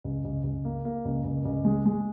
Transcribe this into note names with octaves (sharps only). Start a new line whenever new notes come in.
C#2
C#2
C#2
A#3
A#3
C#2
C#2
C#2
G#3
G#3